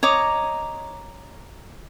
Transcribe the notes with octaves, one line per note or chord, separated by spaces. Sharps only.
C#5 D#5 A#5 D6